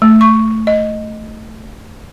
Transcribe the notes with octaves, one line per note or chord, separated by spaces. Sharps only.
A3
C#6
D#5